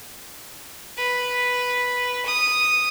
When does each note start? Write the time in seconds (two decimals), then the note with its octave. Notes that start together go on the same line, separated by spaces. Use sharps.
0.97 B4
2.25 D#6